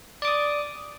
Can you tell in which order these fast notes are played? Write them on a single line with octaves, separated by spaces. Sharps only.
D5 D6 D#6